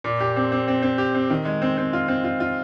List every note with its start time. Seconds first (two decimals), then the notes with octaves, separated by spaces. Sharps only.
0.04 A#2
0.20 G4
0.36 C4
0.52 C4
0.68 C4
0.82 C4
0.98 G4
1.15 C4
1.30 D#3
1.45 G#3
1.62 C4
1.78 C4
1.93 F4
2.08 C4
2.24 F4
2.40 F4